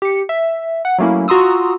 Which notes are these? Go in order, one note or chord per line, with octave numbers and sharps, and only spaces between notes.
G4 C#7
E5
F#5
F#3 A3 A#3 C#4 E4
F4 F#4 A#5 C6 D#6 E6